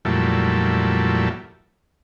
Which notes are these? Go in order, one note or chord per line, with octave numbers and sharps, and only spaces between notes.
F2 A#2 F#3 G3 A3 E4